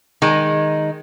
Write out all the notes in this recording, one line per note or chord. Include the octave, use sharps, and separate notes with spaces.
D#3 G#3